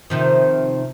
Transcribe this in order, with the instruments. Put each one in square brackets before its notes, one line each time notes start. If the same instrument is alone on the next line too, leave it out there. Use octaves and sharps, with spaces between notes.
[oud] C3 D#3 F3